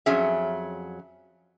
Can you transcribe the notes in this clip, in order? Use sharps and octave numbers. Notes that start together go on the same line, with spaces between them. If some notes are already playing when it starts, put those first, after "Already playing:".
F2 F#3 C#4 G#4 E5